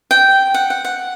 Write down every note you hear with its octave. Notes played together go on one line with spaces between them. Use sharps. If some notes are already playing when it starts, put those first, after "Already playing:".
G5
F#5
F#5
F#5